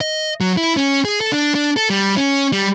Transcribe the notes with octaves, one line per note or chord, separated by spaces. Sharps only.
D#5
F#3
E4
C#4
G#4
A4
D4
D4
A4
G3
C#4
G3